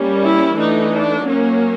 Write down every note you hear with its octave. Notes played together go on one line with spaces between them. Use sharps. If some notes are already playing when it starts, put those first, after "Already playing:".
Already playing: G3 A#3 C#4
E4
E3 A3 D4 D#4
D4
F#3 A#3 C#4